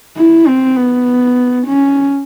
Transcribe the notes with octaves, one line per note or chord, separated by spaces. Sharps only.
E4
C4
B3
C#4